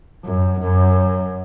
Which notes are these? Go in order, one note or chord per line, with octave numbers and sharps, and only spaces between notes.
F#2
F#2